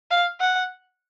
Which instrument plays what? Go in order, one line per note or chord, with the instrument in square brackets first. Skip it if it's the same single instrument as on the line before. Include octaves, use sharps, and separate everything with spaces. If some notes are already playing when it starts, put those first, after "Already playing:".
[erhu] F5
F#5